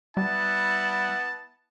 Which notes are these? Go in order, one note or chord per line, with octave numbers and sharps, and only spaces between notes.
G3 B3 E4 F#5 A5